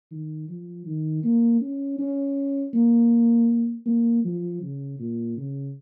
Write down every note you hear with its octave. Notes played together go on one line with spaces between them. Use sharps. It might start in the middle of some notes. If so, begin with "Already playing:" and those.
D#3
F3
D#3
A#3
C#4
C#4
A#3
A#3
F3
C#3
A#2
C#3